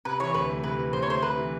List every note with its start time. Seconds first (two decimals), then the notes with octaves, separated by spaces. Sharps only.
0.05 C3 B4
0.20 E3 C#5
0.34 D2 B4
0.50 A3
0.64 C3 B4
0.79 E3
0.93 D2 C5
1.02 C#5
1.08 A3 C5
1.23 C3 B4
1.38 E3